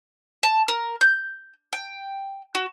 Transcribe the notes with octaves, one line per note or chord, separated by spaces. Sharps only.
A5
A#4
G6
G5
F#4